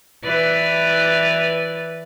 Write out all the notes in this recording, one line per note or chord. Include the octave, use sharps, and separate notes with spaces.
E3 B4 D5